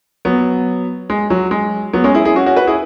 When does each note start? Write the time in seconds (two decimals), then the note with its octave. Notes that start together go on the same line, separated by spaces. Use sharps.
0.25 F#3 B3
1.10 G#3
1.30 F#3
1.51 G#3
1.93 F#3 B3
2.04 G#3 C#4
2.15 E4 G#4
2.25 E4 G#4
2.36 C#4 F#4
2.46 C#4 F#4
2.56 F#4 B4
2.67 E4 G#4